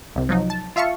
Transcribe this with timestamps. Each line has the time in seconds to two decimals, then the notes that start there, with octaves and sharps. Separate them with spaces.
0.16 C2 C3
0.29 F3 F#3 D#4
0.50 A5
0.76 F4 E5 F5 A5 C#6